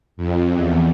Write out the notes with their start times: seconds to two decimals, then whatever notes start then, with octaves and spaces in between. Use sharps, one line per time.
0.17 F2
0.55 E2